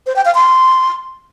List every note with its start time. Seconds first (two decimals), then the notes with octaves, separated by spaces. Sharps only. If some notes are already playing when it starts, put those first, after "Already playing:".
0.07 C5
0.16 G5
0.25 F5
0.35 C6